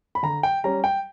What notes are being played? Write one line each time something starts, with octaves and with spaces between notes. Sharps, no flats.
B5
D3 A#5
G5
G3 C#4 A#5
G5